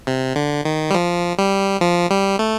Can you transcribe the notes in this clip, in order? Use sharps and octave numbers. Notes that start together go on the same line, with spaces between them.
C3
D3
D#3
G3
F3
G3
F3
G3
A3